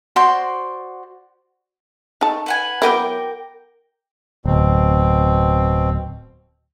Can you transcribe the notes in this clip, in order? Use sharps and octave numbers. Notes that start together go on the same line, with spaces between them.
F#4 C5 D5 C6
A3 D#4 A5
B4 F#5 G#5
F#3 B3 E4 A#4 G5 D6
D1 B2 C4